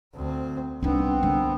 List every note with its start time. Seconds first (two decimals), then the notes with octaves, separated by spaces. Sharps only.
0.15 D2 C4
0.83 C2 B3 C4 D4 D#4
1.23 D3 D#3